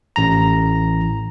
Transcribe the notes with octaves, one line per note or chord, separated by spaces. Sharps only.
A1 A#5